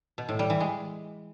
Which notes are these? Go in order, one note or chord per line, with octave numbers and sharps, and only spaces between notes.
B2
A2
G3
E3
G#3